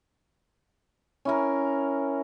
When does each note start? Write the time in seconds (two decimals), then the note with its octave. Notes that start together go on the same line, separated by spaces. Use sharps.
1.25 C#4 E4 A#4